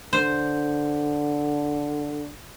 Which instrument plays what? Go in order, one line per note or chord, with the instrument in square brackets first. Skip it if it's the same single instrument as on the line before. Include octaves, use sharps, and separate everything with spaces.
[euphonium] D3 [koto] C5